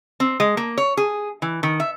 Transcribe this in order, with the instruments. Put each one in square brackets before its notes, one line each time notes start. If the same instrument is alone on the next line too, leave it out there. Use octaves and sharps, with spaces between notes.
[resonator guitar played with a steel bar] C4
G#3
A#3
C#5
G#4
E3
D#3
E5